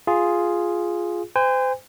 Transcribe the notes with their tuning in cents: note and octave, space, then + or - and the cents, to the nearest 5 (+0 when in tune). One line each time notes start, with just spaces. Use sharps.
F4 +0 G#4 +0
C5 -35 G#5 -45